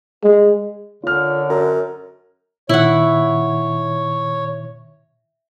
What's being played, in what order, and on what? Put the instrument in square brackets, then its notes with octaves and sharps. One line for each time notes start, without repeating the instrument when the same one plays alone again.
[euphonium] G#3
[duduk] D3 [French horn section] C#4 A#4 C#5 [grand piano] F4 F6
[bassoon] F#2 [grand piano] A#5
[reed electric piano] A#2 D#3 [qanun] E4 F#5 [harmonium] C#5